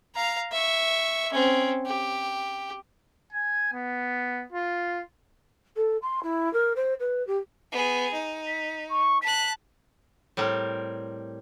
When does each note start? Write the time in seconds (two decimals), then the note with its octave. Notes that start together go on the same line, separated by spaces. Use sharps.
0.15 F5 A#5
0.52 E5 C#6
1.33 C4 C#4
1.86 G4
3.33 G#5
3.73 B3
4.53 F4
5.76 A4
6.02 C6
6.23 E4
6.53 A#4
6.76 C5
6.99 B4
7.27 G4
7.72 B3 G#4
8.13 D#4
8.47 B6
8.90 C#6
9.22 A5 F#6 B6
10.37 A2 G3 C4 A#4